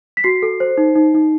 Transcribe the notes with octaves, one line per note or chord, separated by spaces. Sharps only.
B6
F#4 C7
A4
C5
D#4
D#4
D#4